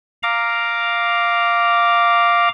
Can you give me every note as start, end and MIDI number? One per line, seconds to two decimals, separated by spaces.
0.23 2.49 77
0.23 2.49 82
0.23 2.49 86